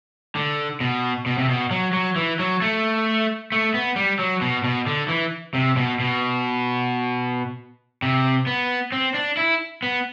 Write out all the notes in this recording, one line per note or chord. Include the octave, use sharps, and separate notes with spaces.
D3
B2
B2
C3
B2
F#3
F#3
E3
F#3
A3
A3
B3
G3
F#3
B2
B2
D3
E3
C3
B2
B2
C3
B3
C4
D4
E4
B3